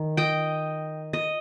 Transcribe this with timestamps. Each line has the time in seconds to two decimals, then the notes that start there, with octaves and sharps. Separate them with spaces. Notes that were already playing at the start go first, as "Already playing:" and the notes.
Already playing: D#3
0.17 D#5 G5
1.13 D#5